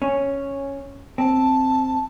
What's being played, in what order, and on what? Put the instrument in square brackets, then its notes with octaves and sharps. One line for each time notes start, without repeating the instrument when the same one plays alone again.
[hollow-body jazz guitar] C#4
[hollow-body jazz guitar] C4 [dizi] A5